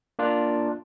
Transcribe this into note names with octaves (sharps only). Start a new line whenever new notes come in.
A#3 D4 F4